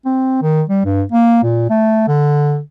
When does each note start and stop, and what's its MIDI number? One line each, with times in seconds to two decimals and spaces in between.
0.05 0.38 60
0.42 0.62 51
0.69 0.83 55
0.85 1.03 43
1.12 1.43 58
1.43 1.68 46
1.70 2.07 57
2.08 2.59 50